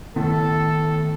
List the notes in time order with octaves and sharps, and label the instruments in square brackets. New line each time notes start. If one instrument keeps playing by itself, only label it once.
[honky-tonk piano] A2 [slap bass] D#3 B3 [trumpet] A4